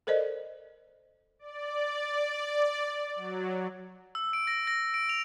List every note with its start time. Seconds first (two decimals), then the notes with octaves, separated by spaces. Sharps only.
0.07 A4 A#4 C5 D5 D#5
1.39 D5
3.16 F#3
4.15 E6
4.33 D7
4.47 A#6
4.67 A#6
4.94 D7
5.09 F7